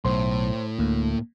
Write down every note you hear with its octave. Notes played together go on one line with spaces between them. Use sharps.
B1 A2 C5 C6
D2 A#3